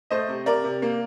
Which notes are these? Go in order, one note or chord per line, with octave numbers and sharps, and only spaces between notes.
A3 C5 D#5
C3
C3 A#4 D5
C3
A#3